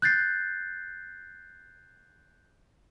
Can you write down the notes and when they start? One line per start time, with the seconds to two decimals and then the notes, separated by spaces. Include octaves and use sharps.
0.02 F#6 G6 A6 C7